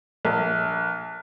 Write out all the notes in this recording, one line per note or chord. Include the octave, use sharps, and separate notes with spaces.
A#1